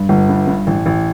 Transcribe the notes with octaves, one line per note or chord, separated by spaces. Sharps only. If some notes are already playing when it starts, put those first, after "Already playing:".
Already playing: G2
G1
G2
G2
A1
A1